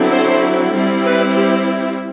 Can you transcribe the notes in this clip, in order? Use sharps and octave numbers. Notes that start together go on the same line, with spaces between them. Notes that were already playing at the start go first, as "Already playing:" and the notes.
Already playing: D3 F#3 C4 E4
C5
G3 C4 E4
B4
G4